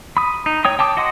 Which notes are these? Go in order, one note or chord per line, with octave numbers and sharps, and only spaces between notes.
B5 D#6
D#4
C#5 G5 D#6
G5 A5 D6 D#6
F#4 D#5 F#5 C6 D#6